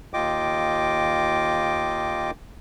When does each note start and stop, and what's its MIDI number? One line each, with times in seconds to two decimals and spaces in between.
0.14 2.31 39
0.14 2.31 65
0.14 2.31 75
0.14 2.31 79
0.14 2.31 86